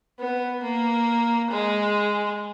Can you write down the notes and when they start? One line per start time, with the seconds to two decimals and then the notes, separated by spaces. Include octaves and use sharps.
0.19 B3
0.63 A#3
1.50 G#3